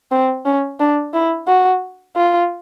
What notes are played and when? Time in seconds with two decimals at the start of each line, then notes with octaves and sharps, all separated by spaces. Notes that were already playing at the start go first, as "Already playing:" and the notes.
0.11 C4
0.45 C#4
0.80 D4
1.14 E4
1.47 F#4
2.16 F4